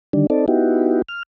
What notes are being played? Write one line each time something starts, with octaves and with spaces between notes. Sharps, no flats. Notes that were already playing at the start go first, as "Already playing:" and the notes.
D3 D#3 G3 D4
C4 D#4 A4 D5
B3 D#4 E4 F#4 G4
F6